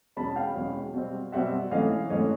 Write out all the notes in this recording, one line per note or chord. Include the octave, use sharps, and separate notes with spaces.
E2 B2 G#3 C#4 A5 B5
F5 G5
E2 B2 G#3 C#4
B2 G3 C4
B2 G3 C4 E5 F#5
G#2 E3 A3 C#4 D#5 F5
G#2 E3 A3 C#4 C#5 D#5